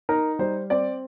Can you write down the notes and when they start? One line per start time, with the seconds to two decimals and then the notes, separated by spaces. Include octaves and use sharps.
0.09 D#4 A#4
0.39 G3 C5
0.70 C4 D5